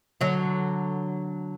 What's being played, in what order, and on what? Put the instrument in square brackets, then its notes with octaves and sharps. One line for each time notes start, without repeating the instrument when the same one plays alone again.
[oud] D3 F#3